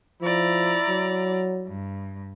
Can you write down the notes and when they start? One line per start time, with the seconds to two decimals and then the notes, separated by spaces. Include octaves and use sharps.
0.22 F3 E4 D5 A#5
0.89 F#3
1.67 G2